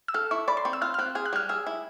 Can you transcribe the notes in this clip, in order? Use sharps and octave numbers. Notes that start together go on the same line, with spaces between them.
E6
A4 F6
E4 C#6
D5 B5
C6
C4 C#6
E6
F4 F6
F6
C4 F#6
G#4 F6
F#6
G3 F6
G#4 E6
E4